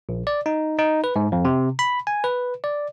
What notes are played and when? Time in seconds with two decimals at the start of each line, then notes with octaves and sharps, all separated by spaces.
0.09 A#1
0.27 D5
0.46 D#4
0.79 D#4
1.04 B4
1.16 G#2
1.32 F2
1.45 C3
1.79 B5
2.07 G#5
2.24 B4
2.64 D5